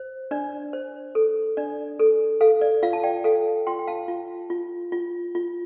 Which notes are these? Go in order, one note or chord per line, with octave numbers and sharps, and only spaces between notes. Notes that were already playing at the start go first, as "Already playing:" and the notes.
Already playing: C5
D4 D5
C5
A4
D4 D5
A4
A4 F5
D5
F4 F5
A5
D5 G5
A4 F5
F4 G5 C6
G5
F5 A5
F4
F4
F4
F4